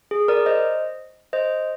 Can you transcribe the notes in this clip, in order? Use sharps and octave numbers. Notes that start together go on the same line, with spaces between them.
G#4
A#4 D5
C5 D#5
C5 D#5